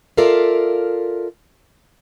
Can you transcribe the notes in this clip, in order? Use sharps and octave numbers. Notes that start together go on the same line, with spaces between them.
F4 A4 A#4 D5 E5 F5